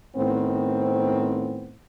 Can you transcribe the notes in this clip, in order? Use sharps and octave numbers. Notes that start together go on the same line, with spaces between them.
A2 D#3 B3 C4